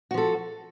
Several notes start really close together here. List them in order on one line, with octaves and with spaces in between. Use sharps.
F#4 F3 A4